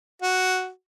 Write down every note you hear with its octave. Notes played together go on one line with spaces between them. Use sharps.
F#4